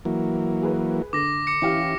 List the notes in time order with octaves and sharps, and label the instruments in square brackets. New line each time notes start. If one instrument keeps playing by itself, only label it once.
[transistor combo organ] E3 F#3 A#3
[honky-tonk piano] G#4 B4
[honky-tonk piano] D3 [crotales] D6 A#6
[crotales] D6 C#7
[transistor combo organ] E3 C#4 [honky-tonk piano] E4 G4 F5